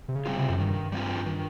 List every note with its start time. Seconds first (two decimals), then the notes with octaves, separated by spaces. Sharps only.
0.08 C3
0.16 C#3
0.26 G3 C4 F4
0.37 C3
0.50 F#2
0.59 G2 D#3
0.92 G3 C4 F4
1.26 D#3